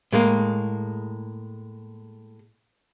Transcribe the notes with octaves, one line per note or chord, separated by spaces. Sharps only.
A2 G#3 A#3